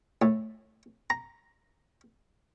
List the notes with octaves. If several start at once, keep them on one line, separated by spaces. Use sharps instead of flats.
A2
A#5